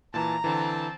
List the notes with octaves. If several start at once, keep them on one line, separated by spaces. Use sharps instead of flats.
A#2 E3 A5 A#5
D3 E3 C4 A5